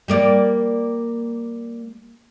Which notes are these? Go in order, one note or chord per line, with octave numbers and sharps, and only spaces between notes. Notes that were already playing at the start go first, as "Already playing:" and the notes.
G3 A#3 D5